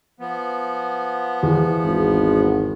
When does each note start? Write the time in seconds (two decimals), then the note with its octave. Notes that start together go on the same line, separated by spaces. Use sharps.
0.20 F3 B3
1.43 E2
1.85 G#1